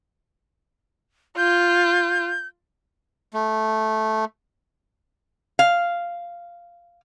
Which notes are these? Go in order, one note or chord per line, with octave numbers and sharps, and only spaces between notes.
F4 G6
A3
F5